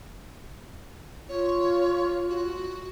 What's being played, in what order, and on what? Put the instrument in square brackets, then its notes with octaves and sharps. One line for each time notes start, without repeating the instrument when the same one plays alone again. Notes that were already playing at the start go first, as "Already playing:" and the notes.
[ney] F4 [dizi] C#5
[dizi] F#4